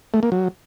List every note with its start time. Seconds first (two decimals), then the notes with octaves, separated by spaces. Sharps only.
0.14 A3
0.23 A#3
0.32 F#3